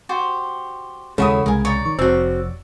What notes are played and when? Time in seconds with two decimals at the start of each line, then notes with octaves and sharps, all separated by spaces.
0.09 F#4 G4 C5
1.18 D#2 C#3 G#3 E4 F#4 A4 C#5 D#6
1.46 C2 G#3 A#4 G#5
1.65 C#5 D5 A#5
1.85 D#3 C#6
1.99 F1 C4 F#4 E6